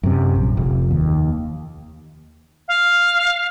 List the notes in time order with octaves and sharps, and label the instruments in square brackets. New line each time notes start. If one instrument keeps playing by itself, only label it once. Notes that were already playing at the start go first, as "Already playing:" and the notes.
[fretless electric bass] F#2 C3
A#1
F1
D#2
[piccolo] F5